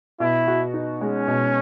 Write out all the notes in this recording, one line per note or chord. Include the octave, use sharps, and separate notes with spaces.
B2 E4
F#4
D#4
G#3 C#4
B2